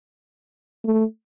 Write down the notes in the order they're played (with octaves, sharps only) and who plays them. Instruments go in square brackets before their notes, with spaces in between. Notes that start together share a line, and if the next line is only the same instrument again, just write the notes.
[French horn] A3